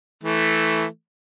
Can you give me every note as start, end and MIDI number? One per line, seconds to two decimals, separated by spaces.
0.23 0.85 52
0.23 0.85 57